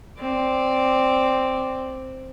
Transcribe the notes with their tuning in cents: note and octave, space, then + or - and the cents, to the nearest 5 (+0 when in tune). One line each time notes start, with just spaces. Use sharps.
C4 +0 D5 +0